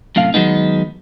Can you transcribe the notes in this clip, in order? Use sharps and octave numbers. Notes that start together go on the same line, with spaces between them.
F#2 A2 C3 F5
D#3 F#3 G#3 B3 D#4